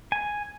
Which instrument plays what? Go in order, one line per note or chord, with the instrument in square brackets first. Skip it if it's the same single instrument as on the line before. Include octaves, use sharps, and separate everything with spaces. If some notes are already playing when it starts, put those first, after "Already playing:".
[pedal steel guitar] G#5